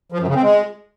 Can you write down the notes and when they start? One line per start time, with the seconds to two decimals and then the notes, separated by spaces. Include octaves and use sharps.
0.12 F3
0.20 F#2
0.27 C#3
0.35 C4
0.43 G#3